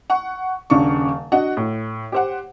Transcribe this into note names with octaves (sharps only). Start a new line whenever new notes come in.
F#5 C#6
D#1 C#3 D4 C#6
D4 F#4 D#5 F#5
A2
G4 C5 F#5